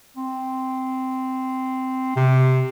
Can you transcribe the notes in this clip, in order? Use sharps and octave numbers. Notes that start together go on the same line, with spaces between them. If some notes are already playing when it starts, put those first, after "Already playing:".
C4
C3